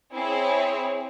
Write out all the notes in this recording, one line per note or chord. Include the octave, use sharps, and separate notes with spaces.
C4 E4 G#4 C#5